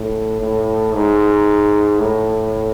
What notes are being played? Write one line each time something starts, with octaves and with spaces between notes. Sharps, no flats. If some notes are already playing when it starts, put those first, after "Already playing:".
Already playing: A2
A2
G#2
A2